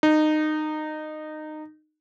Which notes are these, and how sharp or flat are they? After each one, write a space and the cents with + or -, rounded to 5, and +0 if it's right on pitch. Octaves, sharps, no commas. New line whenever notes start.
D#4 -20